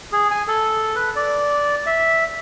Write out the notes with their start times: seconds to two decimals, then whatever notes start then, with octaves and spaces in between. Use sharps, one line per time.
0.12 G#4
0.31 G#5
0.47 A4
0.96 B4
1.16 D5
1.86 E5